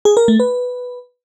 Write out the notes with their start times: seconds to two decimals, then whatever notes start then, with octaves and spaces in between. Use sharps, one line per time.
0.05 G#4
0.17 A#4
0.28 A3
0.40 B4